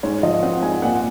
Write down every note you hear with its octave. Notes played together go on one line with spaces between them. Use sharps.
G#2 C#5
F3 D#5
C4 F#5
G#2 G#5
A#2 F#5